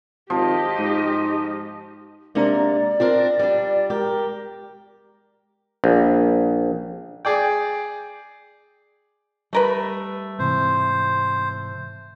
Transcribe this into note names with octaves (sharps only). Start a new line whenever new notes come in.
G#1 F3 G4 D#5
G#2
C3 G#3 A#3 D4 D5 A#5
C4 D4 F4 A#4
G3 D4
G#3 G4 A#4
A#1
G#4 D5 G5
G3 A3 A#4 B4
G#2 C3 E3 C5